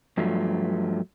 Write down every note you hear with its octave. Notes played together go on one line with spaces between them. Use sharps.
G2 F3 F#3 A3